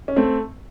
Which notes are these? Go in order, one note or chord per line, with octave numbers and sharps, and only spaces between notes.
C#4
A3 C4